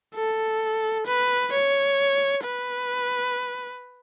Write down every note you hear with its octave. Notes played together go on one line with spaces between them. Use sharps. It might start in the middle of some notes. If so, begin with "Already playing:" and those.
A4
B4
C#5
B4